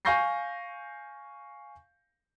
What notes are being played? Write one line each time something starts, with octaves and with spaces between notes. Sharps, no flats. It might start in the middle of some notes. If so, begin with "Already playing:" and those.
F5 G#5 C#6 G6 A#6 C7